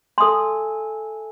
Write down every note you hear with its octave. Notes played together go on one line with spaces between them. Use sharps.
A4 E5 G#5 C6 D#6